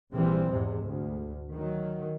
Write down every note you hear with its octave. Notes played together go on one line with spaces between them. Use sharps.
A#1 C3 E3 G3 C4
E2 G#2 C3 G#3
D2
D#3 F#3